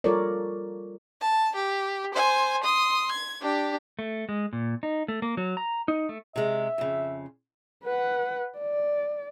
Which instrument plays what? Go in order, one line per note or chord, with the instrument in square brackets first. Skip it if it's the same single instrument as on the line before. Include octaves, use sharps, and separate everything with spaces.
[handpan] G3 F4 A4 A#4 C#5 D5
[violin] A5
G4
C5 G#5
C6 D#6
G#6
D4 G4
[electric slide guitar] A3
G#3
A#2
D#4
A3
A#3
F#3
A#5
D#4
A3
[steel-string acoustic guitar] C3 G#3 [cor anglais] E5
[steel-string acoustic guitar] F2 C#3
[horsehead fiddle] B4 F#5
D5